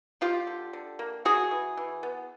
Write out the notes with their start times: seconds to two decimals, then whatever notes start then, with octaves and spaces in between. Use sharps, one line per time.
0.21 G3 F4 G4
0.47 D3
0.73 D3
0.99 A#3
1.25 G#3 F#4 G#4
1.51 E3
1.77 E3
2.03 B3